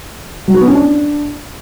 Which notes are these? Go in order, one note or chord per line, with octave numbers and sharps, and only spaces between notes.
F#3
F#4
B3
C#4
D4